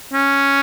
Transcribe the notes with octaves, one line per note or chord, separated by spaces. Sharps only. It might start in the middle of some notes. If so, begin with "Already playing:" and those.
C#4